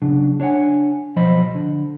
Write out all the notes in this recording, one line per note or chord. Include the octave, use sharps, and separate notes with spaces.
C#3 F#3 D4
D4 C#5 D5 F#5 G#5
B1 F3 F#3 C5 D#5 B5
D3